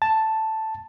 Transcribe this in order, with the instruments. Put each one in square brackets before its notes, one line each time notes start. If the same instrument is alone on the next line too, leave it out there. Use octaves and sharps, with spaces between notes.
[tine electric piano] A5